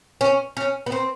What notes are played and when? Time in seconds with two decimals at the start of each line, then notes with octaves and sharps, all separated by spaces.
0.21 C#4
0.57 C#4
0.86 B3
0.92 C4